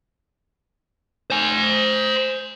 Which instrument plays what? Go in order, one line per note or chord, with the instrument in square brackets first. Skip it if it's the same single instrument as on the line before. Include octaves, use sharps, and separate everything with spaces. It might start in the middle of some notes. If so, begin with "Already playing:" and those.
[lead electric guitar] C5 G#5